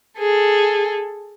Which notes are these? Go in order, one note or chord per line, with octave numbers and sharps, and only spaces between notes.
G#4 A4